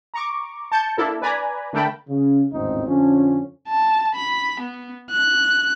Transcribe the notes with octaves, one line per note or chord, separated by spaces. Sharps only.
A#5 C#6 D6
A5 G6 C#7
A#3 D4 E4 A4 A#4
B4 D5 G#5 A#5 B5
D3 A3 A#4 G5 A5 B5
C#3
G#1 E2 A2 C#3 C4 D#4
F2 D3 F3 C#4
A5
B5
B3
F#6